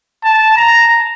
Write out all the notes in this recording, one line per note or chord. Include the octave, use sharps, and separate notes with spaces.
A5
A#5